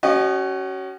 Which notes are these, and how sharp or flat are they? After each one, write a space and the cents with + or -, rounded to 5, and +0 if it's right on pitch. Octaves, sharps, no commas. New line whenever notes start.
C#4 +5 F#4 +35 D#5 -30